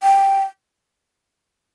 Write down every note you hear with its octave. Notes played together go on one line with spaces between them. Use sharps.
G5